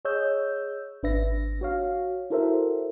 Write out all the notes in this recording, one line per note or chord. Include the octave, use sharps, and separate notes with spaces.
G#4 C#5 D#5 E6 G6
G#1 D4 B4 E5 A#6
F#4 C#5 F5
E4 F#4 A4 A#4 C5 E5